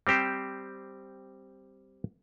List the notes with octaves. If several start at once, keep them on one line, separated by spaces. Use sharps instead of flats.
G3 C4 G4 C5